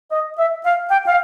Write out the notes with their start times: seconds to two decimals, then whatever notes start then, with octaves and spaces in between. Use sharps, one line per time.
0.11 D#5
0.38 E5
0.65 F5
0.90 G5
1.07 F5